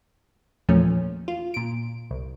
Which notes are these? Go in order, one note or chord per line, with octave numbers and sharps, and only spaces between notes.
E2 A#2 F3 A3 C#4
F4
A#2 D7
C2